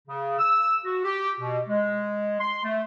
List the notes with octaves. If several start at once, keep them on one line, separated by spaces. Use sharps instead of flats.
C#3
E6
F#4
G4
B2
G#3
C6
A3